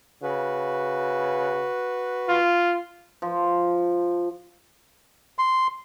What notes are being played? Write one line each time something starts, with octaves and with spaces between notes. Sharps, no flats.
C#3 F#4 B4
F4
F3
C6